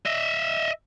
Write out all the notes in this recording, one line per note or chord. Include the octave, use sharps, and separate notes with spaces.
D#5 E5